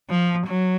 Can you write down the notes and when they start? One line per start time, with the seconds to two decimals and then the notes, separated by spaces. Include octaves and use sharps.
0.10 F3
0.47 F#3